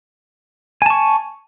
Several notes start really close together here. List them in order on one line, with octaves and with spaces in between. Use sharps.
G#5 A5 C#6